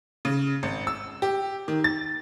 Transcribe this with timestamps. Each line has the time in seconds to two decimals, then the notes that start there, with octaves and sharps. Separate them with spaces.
0.25 C#3
0.63 G#1
0.87 E6
1.22 G4
1.68 D#3
1.84 A6